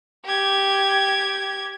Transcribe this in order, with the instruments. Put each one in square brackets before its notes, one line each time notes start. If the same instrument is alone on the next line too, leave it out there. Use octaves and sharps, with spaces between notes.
[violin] G4 G#6